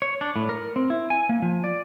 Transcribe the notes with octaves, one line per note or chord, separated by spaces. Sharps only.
C#5
D4
A2
A#4
C4
E4
G#5
A#3
F3
D5